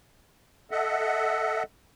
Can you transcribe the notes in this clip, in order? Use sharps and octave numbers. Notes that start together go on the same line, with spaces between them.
A4 D#5 E5 F#5